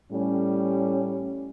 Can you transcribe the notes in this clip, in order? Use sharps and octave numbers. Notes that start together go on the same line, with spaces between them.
A2 G3 C#4